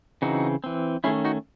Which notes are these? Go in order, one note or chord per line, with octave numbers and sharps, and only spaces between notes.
C#3 E3 C4 D#4 F#4
E3 C4
D#3 A3 C#4 E4 G#4
D#4 F#4